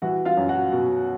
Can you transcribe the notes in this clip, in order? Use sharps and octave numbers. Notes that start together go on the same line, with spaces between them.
E3 F#4 F#5
F4 F5
F#2
F#4 F#5
B2